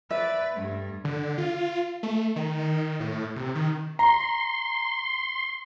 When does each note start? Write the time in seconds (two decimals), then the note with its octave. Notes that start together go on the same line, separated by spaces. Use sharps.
0.11 B4 D5 E5
0.54 G2 A3
1.04 D3
1.38 F4
2.03 A3
2.36 D#3
3.00 A2
3.36 C3
3.55 D#3
3.99 A#5 C6